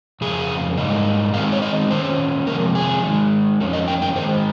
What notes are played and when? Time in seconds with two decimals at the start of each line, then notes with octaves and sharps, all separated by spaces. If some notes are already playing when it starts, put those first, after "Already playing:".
0.21 F2 C#3 A#3 G#4
0.77 G#2 G3 A#3 D#4
1.34 D#3 G#3 C4 D#4 F5
1.52 C#5
1.62 D#5
1.90 D#3 A#3 C#4 C5
2.47 C3 F3 G#3 A#4
2.75 G#4
3.03 D#3 G#3 D#4
3.60 F2 D#3 A#3 C#4
3.73 D#5
3.88 G5
4.02 G5
4.16 D#3 G#3 D#4 C5